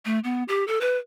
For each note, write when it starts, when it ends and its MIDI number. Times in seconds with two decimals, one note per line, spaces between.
0.05 0.19 57
0.24 0.43 59
0.48 0.66 67
0.68 0.79 69
0.81 0.97 71